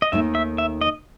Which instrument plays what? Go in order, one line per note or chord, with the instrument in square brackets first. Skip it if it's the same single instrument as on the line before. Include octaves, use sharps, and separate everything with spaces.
[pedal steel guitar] D#5
[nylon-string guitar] D#2 D#3 A3 D#4 [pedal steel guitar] E5
[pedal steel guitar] E5
E5
D#5